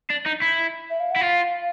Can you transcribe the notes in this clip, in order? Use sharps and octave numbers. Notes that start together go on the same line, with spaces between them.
D4
D#4
E4
E5
F5
F#5
E4
F4 F5